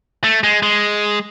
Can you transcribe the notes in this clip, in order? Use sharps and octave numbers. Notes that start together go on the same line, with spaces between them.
A3
G#3
G#3